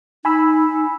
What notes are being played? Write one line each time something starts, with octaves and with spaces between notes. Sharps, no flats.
D#4 G#5 B5 E6